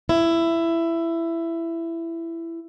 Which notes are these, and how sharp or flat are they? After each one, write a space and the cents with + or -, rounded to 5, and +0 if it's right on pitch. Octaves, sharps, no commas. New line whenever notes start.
E4 +15